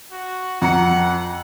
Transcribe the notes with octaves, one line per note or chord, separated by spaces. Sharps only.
F#4
F2 F#5 A#5 C#7